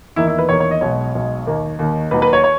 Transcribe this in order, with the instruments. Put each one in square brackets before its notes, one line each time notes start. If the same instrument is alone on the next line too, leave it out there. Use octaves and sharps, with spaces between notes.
[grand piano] E2 D#3 A#3 E4
E4
B4
E2 D#3 A#3 C#5
C#5
D#5
B1 B2 G#3 C#5
B1 B2 G#3
D#2 D#3 A#3
D#2 D#3 A#3
D#2 D#3 F#3 B4
B4
C#5
C#5